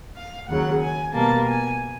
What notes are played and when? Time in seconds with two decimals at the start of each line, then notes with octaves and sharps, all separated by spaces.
0.15 F5
0.48 D#2 C#3 F#3 F#5
0.81 G#5
1.14 B2 G3 A#3 A5
1.47 G#5